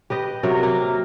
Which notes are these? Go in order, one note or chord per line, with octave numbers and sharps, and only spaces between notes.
G4 B4 D#5
C3 F#3 A#4
A#3